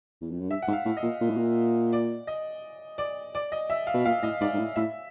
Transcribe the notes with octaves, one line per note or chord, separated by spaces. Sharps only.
E2
F2
F#2
G2 E5
F#5
G#2
F5
A2
D#5
A#2
A#2
A2
A#2
D5
D#5
D5
D5
D#5
E5
F5
B2
A#2 F5
A2 D#5
G#2 D5
G#2
A2
A2 E5